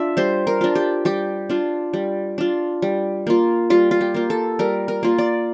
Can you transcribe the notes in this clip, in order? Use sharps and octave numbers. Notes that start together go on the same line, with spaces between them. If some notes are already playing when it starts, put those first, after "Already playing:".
Already playing: D4 F4 E5
G3 C5
A#4
D4 F4
G4
G3 G4
D4 F4
G3
D4 F4
G3
A#3 F4
G3 F4
F4
G4
A#3 F4
A4
G3 A#4
A#4
A#3 F4
D5